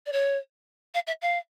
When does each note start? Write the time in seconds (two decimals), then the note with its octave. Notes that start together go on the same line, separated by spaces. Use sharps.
0.06 D5
0.12 C#5
0.94 F5
1.07 E5
1.22 F5